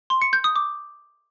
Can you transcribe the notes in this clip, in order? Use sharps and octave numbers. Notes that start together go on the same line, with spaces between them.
C6
C#7
G6
D#6
D6